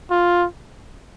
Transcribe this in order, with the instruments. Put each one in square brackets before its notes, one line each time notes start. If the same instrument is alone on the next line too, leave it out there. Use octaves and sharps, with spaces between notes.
[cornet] F4